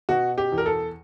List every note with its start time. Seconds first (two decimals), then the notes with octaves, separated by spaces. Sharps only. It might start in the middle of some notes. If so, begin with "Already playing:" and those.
0.09 B2 F#4
0.38 G4
0.52 E2
0.58 A#4
0.66 A4